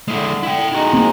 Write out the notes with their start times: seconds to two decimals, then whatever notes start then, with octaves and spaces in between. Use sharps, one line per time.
0.08 D3 G#3 E4
0.43 E4 G5
0.72 G#3 D#4 E4 F#4
0.93 A#3 C4